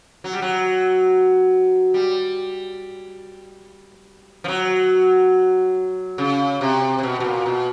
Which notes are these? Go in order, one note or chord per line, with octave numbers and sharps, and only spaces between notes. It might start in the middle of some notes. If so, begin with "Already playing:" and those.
F#3
G3
F#3
G3
F3
F#3
C#3
C3
C3
B2
B2
A#2
B2